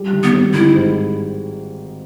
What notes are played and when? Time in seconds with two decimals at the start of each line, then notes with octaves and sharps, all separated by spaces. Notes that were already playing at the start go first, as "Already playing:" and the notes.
Already playing: G3
0.13 D#3
0.23 B3
0.33 G#1
0.54 D#3 E4
0.74 G#2